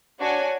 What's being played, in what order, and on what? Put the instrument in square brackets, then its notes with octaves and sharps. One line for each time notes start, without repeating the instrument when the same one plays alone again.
[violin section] D4 F#4 C#5 G#5